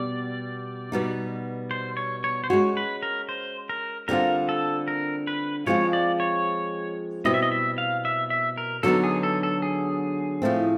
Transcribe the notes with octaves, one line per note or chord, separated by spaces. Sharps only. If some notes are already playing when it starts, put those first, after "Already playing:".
Already playing: B2 G3 B3 D5
B2 G3 B3 D#4
C5
C#5
C#5
C5
G#3 C#4 F#4 C#5
B4
A#4
C5
A#4
D3 G3 C4 F4 A#4
A4
A#4
B4
F3 G#3 C4 F4 G#4 C#5
D5
C#5
B2 G3 C4 E4 D#5
E5
D#5
E5
F5
E5
E5
A#4
D3 F#3 B3 D#4 A4
G#4
A4
A4
G#4
A2 F3 A3 C4